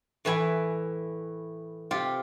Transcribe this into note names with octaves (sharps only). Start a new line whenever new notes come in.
A2 E3 B4 G#5 B5
C3 F4 G4